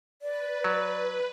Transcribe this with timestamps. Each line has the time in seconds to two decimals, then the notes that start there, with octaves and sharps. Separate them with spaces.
0.22 B4 D5
0.64 F#3